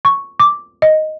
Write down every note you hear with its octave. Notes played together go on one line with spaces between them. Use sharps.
C#6
D6
D#5